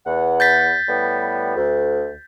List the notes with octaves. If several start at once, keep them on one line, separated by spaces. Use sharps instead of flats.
E2 F#5
G6 A6 B6
A2 G3 B3
D2